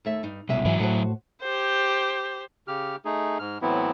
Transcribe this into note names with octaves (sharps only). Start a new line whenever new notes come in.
D#2 A3 E5
G2 D#4
C2 B2 G#3 C#4 E5
G#2 E3 F#3 E4
A2 A3 F#4 C5 F#5
G4 C5
C#3 G4 F6
A3 D#4 G#4
G#2 F6
A2 E3 F#3 B3 C4 E4